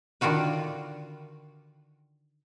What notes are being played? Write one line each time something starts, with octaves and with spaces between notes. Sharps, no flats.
D3 D#3 F4 F#4 B4